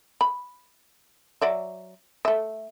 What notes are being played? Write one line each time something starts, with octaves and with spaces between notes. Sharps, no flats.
B5
F#3 D5 E5
A3 E5